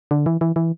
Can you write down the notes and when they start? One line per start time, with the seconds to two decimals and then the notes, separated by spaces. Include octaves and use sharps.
0.11 D3
0.26 E3
0.41 E3
0.56 E3